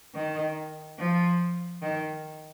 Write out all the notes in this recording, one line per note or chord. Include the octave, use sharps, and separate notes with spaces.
D#3
F3
D#3